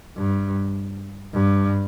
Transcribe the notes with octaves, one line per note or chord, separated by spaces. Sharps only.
G2
G2